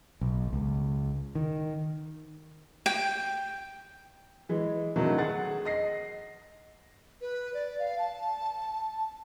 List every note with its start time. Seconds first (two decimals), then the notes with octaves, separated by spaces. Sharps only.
0.21 B1
0.53 C#2
1.35 D#3
2.86 G5
4.49 E3 G#3
4.96 C3 D#3 E3 F#3 A3 D4
5.18 G#4 F#5 A6
5.65 D#5 A#6 C7
7.21 B4
7.54 D5
7.79 F5
7.99 A5